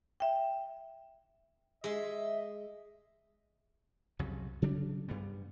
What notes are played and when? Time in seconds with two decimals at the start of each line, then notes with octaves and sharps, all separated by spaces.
0.20 E5 G5
1.84 G#3 D#5 E5 C6
4.19 C2 F2 C#3 F#3
4.62 C#3 F#3 G3 D4
5.08 G2 G3 B3